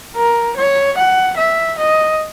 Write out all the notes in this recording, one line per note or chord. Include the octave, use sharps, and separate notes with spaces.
A#4
C#5
F#5
E5
D#5